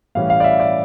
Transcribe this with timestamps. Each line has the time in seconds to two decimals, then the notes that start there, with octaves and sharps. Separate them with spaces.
0.15 A2 E3 G3 C#4 F5
0.30 F5
0.40 D5
0.44 E5
0.60 D5